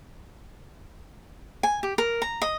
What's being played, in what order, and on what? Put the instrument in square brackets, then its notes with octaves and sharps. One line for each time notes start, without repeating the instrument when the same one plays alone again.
[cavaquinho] G#5
G4
A#4
A#5
D#5